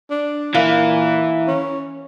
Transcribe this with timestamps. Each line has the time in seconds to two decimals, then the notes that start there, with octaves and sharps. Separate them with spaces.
0.10 D4
0.55 A#2 E3 A#3
1.48 C#4